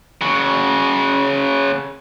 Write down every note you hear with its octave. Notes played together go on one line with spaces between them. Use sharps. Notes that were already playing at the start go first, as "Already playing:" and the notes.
C#3 F#4